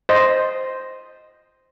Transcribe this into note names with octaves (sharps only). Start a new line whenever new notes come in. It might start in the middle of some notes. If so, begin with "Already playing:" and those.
C5 D#5